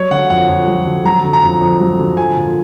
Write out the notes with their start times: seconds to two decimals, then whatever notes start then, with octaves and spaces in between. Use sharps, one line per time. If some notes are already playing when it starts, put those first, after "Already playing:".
Already playing: F#3 C#5
0.11 D3 F#5
0.30 F2 F#5
0.49 F2
0.67 F#3
0.86 D3
1.04 F#3 A#5
1.24 D3
1.33 A#5
1.43 F2
1.61 F2
1.80 F#3
1.99 D3
2.17 F3 G#5
2.37 A#2